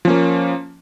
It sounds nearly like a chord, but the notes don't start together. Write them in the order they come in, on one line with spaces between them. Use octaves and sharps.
F3 C#4 A#3